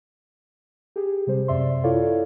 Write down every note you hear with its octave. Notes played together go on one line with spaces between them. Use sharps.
G4 G#4
C3 G3 C5
F#2 C3 D5 E5 C6
E4 F4 A4 C#5 D5 F5